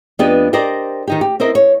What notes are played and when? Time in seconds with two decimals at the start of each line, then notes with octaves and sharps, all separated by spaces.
0.19 F2 B3 D4 G4 B4 D#5
0.53 G4 A#4 C5 D5 D#5
1.08 D#3 D#4 G4
1.21 G4
1.40 C4 E4 A#4 C5 D#5
1.55 C#5